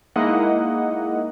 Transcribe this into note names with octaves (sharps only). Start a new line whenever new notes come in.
G#3 A#3 D#4 E4 D#5 F#5